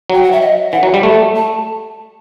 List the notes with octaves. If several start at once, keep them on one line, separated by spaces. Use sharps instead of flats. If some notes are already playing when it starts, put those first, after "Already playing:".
F#3 G5
F#5
E5
D#5
E3 F#5
F#3
G3
A3
A5